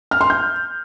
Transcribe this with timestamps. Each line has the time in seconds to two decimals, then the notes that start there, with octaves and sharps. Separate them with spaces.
0.11 F6
0.21 C6
0.30 G6